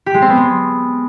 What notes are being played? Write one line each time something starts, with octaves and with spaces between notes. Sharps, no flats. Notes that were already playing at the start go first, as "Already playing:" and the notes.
G4
G#3
C4
B3
G#3